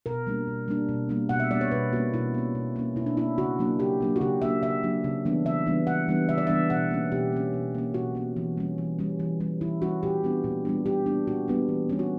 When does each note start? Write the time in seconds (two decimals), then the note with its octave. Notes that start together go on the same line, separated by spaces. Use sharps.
0.06 B2 A#4
0.27 G3 A#3 D4
0.47 B2
0.68 G3 A#3 D4
0.89 B2
1.09 G3 A#3 D4
1.29 B2 F#5
1.40 E5
1.51 G3 A#3 D4 D5
1.61 C#5
1.71 B2 B4
1.93 A#3 C#4 F#4
2.14 B2 E4
2.34 A#3 C#4
2.55 B2
2.76 A#3 C#4
2.96 B2 E4
3.06 D4
3.17 A#3 C#4 E4
3.38 C#3 F#4
3.59 F#3 A#3 D4
3.79 C#3 G4
4.01 F#3 A#3 D4
4.16 F#4
4.21 C#3 G4
4.42 F#3 A#3 D4 E5
4.62 C#3 E5
4.83 F#3 A#3 D4
5.04 C#3
5.26 E3 G3 B3 D4
5.45 C#3 E5
5.66 E3 G3 B3 D4
5.87 C#3 F#5
6.08 E3 G3 B3 D4
6.29 C#3 E5
6.38 D5
6.47 E3 G3 B3 D4 E5
6.70 B2 F#5
6.91 A#3 C#4
7.12 B2 G4
7.33 A#3 C#4
7.54 B2
7.75 A#3 C#4
7.94 B2 F#4
8.15 A#3 C#4
8.37 E3
8.57 G3 C#4
8.78 E3
8.99 G3 C#4
9.20 E3
9.40 G3 C#4
9.61 E3 E4
9.82 G3 C#4 F#4
10.03 A#2 G4
10.24 G3 B3 D4
10.44 A#2
10.65 G3 B3 D4
10.86 A#2 G4
11.06 G3 B3 D4
11.27 A#2 F#4
11.48 G3 B3 D4
11.69 E3
11.89 G3 C#4
11.99 F#4